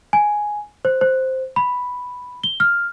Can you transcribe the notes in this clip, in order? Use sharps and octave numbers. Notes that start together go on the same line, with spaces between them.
G#5
C5
C5
B5
G7
F6